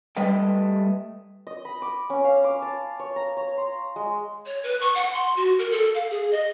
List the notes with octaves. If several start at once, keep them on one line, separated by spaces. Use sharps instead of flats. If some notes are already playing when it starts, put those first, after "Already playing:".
G3 A3 B4 D#5 G5
D#5
B5
D6
C#4
F5
D6
A5
C#5
A#5
C#5
C6
G#3
C#5
B4
C#6
F#5
C6
F#4
A#4
A4
F5
G#4
D#5